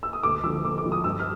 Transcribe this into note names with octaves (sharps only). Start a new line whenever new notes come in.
E6
D#6
D2 D6
D3 F3 E6
D2 D6
D6
D3 F3
D#6
G2 E6
F6